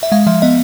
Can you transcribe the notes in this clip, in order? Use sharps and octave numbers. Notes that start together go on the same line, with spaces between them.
E5
G#3 F5
F3 E5
B3 D#5